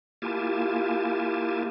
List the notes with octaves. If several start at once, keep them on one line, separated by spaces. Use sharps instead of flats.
A#3 E4 F4 G4 G#5 A5